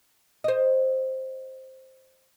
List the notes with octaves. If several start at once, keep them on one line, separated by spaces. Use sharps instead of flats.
C5 D#5